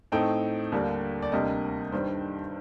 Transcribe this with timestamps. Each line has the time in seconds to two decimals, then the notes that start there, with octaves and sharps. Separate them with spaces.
0.12 A2 A3 C4 D#4 G5
0.72 D#2 D3 G3 A#3 D4
1.22 D5
1.32 D2 C3 G3 A#3 D4 D#5
1.92 G2 D#3 G3 D4 C5